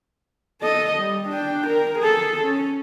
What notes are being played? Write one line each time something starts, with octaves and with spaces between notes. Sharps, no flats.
A4 D#5
G3
D4 G5
A#4
G#4 A4
C#4